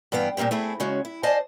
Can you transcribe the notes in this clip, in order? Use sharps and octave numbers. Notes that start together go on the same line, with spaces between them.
G2 E3 B3 F5 G5
A#2 G3 A#3 C4 G4
A3 C4 E4 G#4
C#3 G#3 C#4 F#4
E4
C5 D5 D#5 F5 G#5 A5